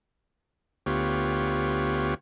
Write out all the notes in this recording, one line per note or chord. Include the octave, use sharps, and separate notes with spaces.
D2 B3 F4 G4 C#5